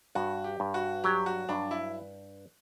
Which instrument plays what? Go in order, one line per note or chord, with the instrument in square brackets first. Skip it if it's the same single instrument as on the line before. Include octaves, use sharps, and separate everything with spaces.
[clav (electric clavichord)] G2 [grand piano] F#4
[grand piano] G4
[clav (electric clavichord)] G2
[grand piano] F#4
[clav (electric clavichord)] F#3 [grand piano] G4
[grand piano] F#4
[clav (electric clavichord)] G2 [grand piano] D4
[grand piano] E4